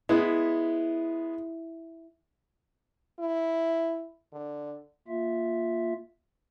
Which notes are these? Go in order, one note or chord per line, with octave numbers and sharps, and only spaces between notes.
G#3 B3 E4
E4
D3
A#3 F4 E5